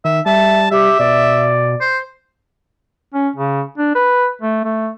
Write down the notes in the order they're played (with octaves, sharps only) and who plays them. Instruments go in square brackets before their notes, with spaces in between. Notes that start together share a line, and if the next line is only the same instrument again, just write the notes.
[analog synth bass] D#3 [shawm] E5
[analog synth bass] G3 [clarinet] E5 [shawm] A5
[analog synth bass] G3 [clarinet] G4 [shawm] E5
[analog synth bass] B2 [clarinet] D5
[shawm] C5
[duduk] C#4
C#3
D4
B4
A3
A3